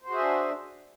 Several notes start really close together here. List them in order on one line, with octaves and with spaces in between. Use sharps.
C5 F#4 G#4 E5 D4